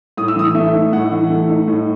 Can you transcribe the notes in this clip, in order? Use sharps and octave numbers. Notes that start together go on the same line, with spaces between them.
A2 D#6
E6
E3 D#6
A3 E5
D#4
A2 F#5
E3
A3
D#4
A2